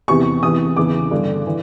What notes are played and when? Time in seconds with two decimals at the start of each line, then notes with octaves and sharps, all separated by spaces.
0.08 E2 C3 E3 C#6
0.43 E2 C3 E3 D#6
0.76 E2 C#3 E3 D6
1.11 G2 D3
1.47 E3